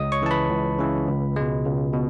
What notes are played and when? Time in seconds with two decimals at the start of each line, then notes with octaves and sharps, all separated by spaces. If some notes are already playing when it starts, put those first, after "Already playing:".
Already playing: C#2 D#5 D#6
0.12 C#5 C#6
0.22 C#3 E3 A5
0.31 B4 B5
0.51 C#2
0.79 C#3 E3
1.08 C#2
1.36 B2 G#3
1.65 C#2
1.94 B2